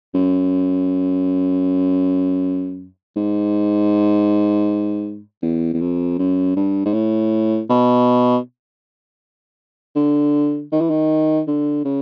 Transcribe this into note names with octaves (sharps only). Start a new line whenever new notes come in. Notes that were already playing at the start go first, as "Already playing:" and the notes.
F#2
G#2
E2
E2
F2
F#2
G2
G#2
A2
B2
D3
D#3
E3
D#3
D3
C#3